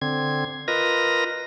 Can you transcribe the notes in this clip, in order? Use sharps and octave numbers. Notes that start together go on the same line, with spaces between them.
D3 C4 G#6
F4 A#4 B4 D#5 A#6